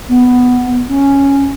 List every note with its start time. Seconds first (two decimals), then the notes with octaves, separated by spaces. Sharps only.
0.09 B3
0.89 C#4